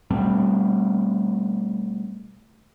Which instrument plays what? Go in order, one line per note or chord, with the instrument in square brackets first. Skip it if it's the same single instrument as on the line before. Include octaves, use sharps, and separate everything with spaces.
[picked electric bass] B2 G3 A3 C4